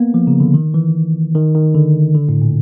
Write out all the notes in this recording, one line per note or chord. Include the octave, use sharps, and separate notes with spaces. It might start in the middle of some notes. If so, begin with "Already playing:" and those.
Already playing: A#3 B3
F3
C#3
D3
D#3
E3
D#3
D#3
D3
D3
A2
A#2